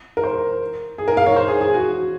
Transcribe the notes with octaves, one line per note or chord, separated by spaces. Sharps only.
A#4
C5
G#4
A#4
F5
C#5
C5
G#4
G#4
F#4